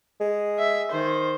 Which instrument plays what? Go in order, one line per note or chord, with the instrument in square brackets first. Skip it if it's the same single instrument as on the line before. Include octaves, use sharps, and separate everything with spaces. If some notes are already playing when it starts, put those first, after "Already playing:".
[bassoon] G#3
[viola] E5
D#3 C5